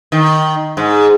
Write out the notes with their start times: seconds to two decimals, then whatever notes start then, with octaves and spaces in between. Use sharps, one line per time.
0.12 D#3
0.77 G#2